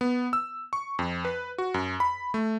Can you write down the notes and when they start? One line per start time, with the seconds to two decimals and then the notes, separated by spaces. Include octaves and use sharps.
0.01 B3
0.33 E6
0.73 C#6
0.99 F2
1.25 B4
1.58 F#4
1.74 F#2
2.00 B5
2.34 A3